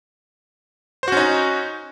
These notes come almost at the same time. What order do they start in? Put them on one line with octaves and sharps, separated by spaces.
C5 F#4 C#4 D#4